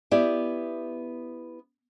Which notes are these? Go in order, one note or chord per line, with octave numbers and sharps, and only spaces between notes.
B3 E4 G4 D5